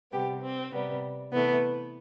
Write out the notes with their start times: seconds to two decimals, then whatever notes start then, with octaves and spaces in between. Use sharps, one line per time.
0.12 C3 G3 B3 G4
0.42 C4
0.72 C3 G3 B3
1.32 C3 E3 A3 B3